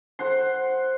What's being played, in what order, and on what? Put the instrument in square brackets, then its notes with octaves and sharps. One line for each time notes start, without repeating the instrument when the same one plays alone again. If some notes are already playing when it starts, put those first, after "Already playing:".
[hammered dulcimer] C5 F#5 C6